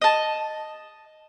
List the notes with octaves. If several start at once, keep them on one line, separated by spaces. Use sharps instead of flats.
D#5 A5